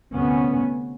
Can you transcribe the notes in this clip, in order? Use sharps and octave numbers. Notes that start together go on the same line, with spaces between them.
D2 C3 B3 C#4